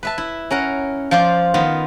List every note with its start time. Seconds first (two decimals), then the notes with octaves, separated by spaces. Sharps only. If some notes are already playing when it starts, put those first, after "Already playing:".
0.03 B4 E5 A5
0.18 E4
0.51 C#4 A#4 F#5
1.11 F3 F4 C5 D5
1.54 D#3 B3 F4